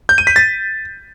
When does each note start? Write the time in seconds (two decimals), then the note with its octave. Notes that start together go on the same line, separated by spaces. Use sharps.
0.09 G6
0.18 D#7
0.27 B6
0.36 A6